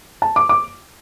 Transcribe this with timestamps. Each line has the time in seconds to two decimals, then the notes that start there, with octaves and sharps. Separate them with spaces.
0.22 A5
0.36 D6
0.49 D6